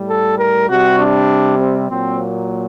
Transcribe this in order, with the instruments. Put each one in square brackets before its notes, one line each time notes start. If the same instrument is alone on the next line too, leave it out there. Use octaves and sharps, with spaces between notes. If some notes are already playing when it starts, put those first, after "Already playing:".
Already playing: [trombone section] A2 G3
A4
A#4
C3 G3 F#4
D4
C4
A#2 F#3 C4
A#3